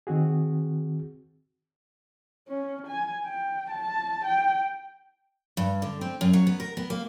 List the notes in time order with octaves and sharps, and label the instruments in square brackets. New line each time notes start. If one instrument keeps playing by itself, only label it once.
[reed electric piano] D#3 C4 F#4 G#4
[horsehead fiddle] C#4
G#5
G5
A5
G5
[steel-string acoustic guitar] G2
D3
C4
F#2
F#3
B3
A#4
B3
A#3